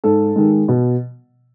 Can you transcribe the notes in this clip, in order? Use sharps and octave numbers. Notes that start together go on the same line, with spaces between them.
G#2 A4
D#3 G#3
B2